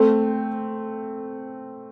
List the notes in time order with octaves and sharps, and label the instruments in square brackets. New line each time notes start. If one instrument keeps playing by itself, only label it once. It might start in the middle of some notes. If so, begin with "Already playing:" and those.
Already playing: [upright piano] A3 C4